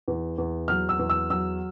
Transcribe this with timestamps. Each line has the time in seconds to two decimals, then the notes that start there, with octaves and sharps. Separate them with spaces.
0.08 E2
0.38 E2
0.68 F#3 F6
0.89 E6
0.99 E2
1.10 E6
1.30 F#3 E6